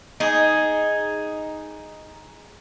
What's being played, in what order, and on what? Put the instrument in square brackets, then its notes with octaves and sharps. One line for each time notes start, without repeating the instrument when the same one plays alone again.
[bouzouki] D#4 G#4